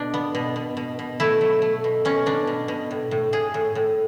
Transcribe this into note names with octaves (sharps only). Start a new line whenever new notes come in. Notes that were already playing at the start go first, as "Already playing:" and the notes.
Already playing: B2 D4
B3
B2
B2
B2
B2
A3 E4
F#3
A3
B2
B2 C#4
B2 D4
B2
B2
A2
A2
A2 G#4
A2
A2